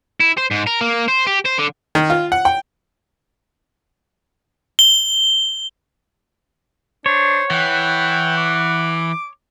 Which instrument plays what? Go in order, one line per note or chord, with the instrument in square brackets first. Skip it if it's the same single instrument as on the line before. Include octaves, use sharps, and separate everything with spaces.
[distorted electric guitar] E4
C5
G#2
A#4
A#3
C5
G4
C5
D3
[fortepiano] D#3
F4
F#5
G5
[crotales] G7
[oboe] D4 [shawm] C5 [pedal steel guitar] C#5
[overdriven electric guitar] E3 [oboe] F#5 [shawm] G5
[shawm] D6